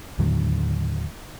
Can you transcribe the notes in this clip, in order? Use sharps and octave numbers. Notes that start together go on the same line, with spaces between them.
D#2 A2 D3 F#3